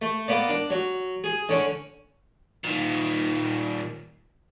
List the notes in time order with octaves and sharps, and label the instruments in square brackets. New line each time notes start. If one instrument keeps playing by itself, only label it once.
[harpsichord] A3
A#3 B3 D5
D4
F#3
G#4
D3 C#4
[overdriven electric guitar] A#2 D#3